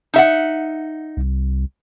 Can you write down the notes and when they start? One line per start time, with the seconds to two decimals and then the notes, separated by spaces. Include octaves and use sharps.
0.14 D#4 E5 F#5
1.17 C2